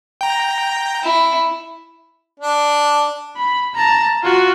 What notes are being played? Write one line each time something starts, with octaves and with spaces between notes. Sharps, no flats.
G5 A#5
E4
D4
B5
A5 A#5
F4 F#4